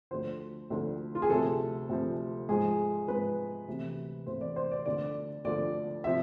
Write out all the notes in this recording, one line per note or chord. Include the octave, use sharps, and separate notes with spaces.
D2 D3 F3 C5
D2 D3 F3
F4
G#4
D2 C3 F3 A4
D2 C3 F3
G#2 F3 G#4
G#2 F3 B4
D2 C3 E3
D2 C3 E3 C5
D5
C5
D5
D2 D3 F3 D5
D2 D3 F3 D5
C3 F3 E5